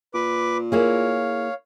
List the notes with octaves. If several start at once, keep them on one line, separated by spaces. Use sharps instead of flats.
A#2 B4 D6
A#3 E4 G#4 C#5 F5